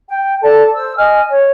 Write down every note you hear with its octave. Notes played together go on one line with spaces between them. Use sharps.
G5
A4 D5 A5
C5 E6
D#5 G#5 F6
C#5